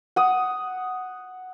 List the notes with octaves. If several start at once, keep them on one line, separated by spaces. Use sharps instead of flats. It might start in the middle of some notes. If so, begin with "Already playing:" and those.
F#5 D#6